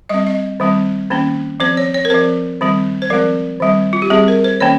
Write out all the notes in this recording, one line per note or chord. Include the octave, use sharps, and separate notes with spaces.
G3 C4 D#5
D#5
D#3 G3 C4
D#3 A#3 C#4
F3 C4 C5
C#5
C#5
A#4
F3 C4 C5
D#3 G3 C4
C5
F3 G#3 C4 A#4
D#3 G3 C4
F4
G4
G3 C4 G#4
A#4
C5
D#3 A#3 C#4 C#5